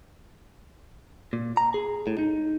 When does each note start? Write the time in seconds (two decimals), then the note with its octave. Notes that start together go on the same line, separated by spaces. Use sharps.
1.33 A#2
1.57 A#5
1.74 G#4
2.07 A2
2.18 D#4